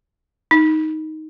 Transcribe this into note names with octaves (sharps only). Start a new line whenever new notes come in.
D#4